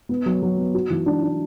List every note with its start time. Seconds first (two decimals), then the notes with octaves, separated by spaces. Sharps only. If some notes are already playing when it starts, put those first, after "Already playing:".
0.09 B3
0.26 F#3
0.42 F#3
0.57 B3
0.74 F#4
0.90 E3
1.06 D4
1.23 D4